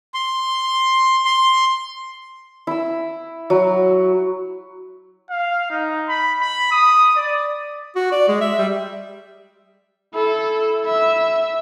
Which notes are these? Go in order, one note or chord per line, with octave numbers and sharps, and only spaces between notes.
C6
C6
E4 E6
F#3
F5
D#4
B5
B5
D#6
D5
F#4
D5
G#3
E5
G3
E4 A4
E5